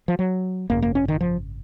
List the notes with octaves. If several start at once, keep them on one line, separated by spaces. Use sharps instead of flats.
F3
F#3
G#1 F#2 C#3 A#3
A#3
C#4
D#3
F3